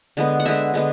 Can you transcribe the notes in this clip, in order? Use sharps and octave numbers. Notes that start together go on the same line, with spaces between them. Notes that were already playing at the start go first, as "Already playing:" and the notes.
D3 G#3 B3
F#5
D3 G#3 B3 E5
D3 G#3 B3